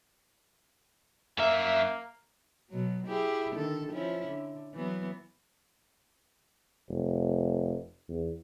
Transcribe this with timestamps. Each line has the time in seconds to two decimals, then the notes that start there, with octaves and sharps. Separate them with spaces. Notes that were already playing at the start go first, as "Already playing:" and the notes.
1.38 F#2 A#3 E5
2.70 B2 F#3
3.07 E4 G4 G#4
3.56 D3 D#3 A4
3.92 F3 C#4 E4
4.28 D3
4.74 E3 F#3 B3
6.89 F1
8.09 E2